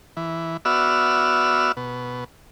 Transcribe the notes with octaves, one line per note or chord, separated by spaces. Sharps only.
E3
B3 F#4 D5 E5 E6 F6
B2